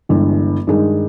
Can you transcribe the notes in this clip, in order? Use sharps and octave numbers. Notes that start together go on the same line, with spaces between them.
G1 G2 E3 G#3
G2 D#3 G#3 D#4 G#4